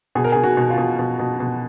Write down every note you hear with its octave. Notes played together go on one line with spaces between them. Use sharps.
B2 G#4
A#4
B2 G#4
F#4
B2
F4
B2
B2
B2
B2